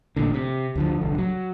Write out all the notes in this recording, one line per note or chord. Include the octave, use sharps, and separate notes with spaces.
A1 A#2 D3
C3
D2 D3 F3
D1 C2 D3
F#3